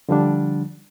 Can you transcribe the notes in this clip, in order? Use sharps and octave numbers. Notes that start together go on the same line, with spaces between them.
D3 F3 G3 D4